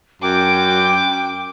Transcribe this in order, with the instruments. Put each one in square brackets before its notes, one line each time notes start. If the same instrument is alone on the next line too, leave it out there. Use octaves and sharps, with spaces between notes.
[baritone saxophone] F#2 [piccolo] G5 [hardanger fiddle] D6